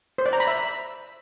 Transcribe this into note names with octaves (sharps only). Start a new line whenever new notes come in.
C5
D5
A#5
B5
E5